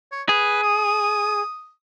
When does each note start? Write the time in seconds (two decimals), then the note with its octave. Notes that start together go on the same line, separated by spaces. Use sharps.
0.12 C#5
0.29 G#4 B4
0.64 D#6